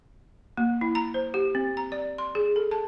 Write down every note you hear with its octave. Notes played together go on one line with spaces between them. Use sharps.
A#3
E4
A#5
C5
G4
C4
A#5
D5
C6
G#4
A4
A5